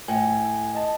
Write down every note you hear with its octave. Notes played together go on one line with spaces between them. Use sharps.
A2 G#5
D#5 A5